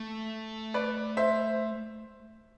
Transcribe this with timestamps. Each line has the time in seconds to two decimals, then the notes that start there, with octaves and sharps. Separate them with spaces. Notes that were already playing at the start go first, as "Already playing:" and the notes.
Already playing: A3
0.74 B4 D5
1.17 C5 E5